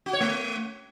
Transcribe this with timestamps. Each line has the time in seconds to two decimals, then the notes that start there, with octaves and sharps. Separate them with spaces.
0.06 F#4
0.13 C#5
0.21 A3